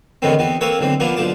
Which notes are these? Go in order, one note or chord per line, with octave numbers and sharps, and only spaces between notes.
E2 A2 D3 D#3 B3 C4
E2 B3 C4
A#3 C4 A4 B4 C#5
B1 D3 E3 C4
F3 A#3 B3 D4 E4
B1 D3 F3 A5 D6